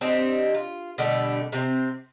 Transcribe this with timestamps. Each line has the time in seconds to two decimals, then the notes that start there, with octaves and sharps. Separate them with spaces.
0.01 C4 D4 D#4 G4
0.54 F4
0.98 B2 D3 G3 A3
1.52 C3 C4